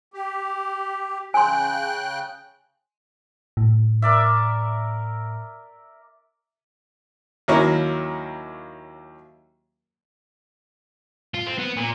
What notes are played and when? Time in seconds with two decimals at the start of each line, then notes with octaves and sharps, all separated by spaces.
0.14 G4
1.34 C#3 G5 G#5 C6 F#6
3.57 A2
4.02 A#4 D5 E5
7.48 D#2 F#3 A#3 C#4 E4 C#6
11.34 F4
11.47 C4
11.59 B3
11.77 A#2